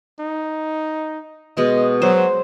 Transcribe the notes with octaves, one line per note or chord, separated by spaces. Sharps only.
D#4
B2 G#3 D#5
F#3 C5